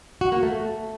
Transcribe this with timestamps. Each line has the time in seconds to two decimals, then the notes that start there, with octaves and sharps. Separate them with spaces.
0.21 F#4
0.32 A#3
0.43 A3